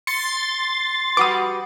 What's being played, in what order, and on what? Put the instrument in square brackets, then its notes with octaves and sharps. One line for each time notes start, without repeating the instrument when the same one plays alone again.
[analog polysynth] C6 A6 [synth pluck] C#7
[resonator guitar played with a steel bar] G3 F#4 B4 [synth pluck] D6 D#6